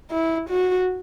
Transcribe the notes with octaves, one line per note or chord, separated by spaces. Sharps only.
E4
F#4